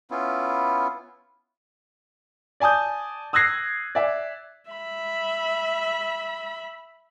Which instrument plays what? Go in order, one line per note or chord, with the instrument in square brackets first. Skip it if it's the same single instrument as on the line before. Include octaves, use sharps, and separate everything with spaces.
[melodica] B3 C#4 E4 F4
[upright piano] D5 G#5 A5 D#6 G6
D#6 E6 F#6 G#6 A#6 C7
D5 E5
[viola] E5 B5